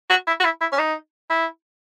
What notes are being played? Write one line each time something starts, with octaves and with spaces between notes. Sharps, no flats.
F#4
E4
F#4
E4
E4
C#4
D#4
E4